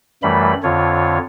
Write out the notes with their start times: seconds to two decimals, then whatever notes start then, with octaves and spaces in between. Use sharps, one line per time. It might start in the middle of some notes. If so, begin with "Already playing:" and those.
0.23 F#2 E3 G3 A3 B5
0.63 F2 D3 F4 C#5